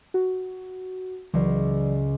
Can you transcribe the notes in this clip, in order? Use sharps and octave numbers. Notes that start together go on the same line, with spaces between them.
F#4
C#2 E3 F#3 D5